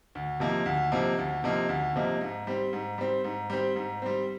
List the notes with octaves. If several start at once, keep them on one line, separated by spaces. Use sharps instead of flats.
D2
C3 F3 A#3 D#4
D2
C3 F3 A#3 D#4
D2
C3 F3 A#3 D#4
D2
C3 F3 A#3 D#4
G#2
G3 C4
G#2
G3 C4
G#2
G3 C4
G#2
G3 C4